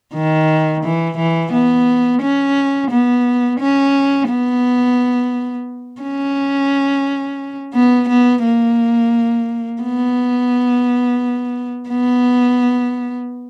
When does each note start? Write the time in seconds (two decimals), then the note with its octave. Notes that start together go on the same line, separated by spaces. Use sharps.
0.14 D#3
0.83 E3
1.18 E3
1.52 B3
2.22 C#4
2.90 B3
3.60 C#4
4.28 B3
6.01 C#4
7.74 B3
8.09 B3
8.43 A#3
9.82 B3
11.89 B3